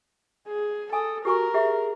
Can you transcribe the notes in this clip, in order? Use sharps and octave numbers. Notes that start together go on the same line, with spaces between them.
G#4
A4 G#5 D#6
F#4 G4 A#4 G#5 C#6
G4 G#4 E5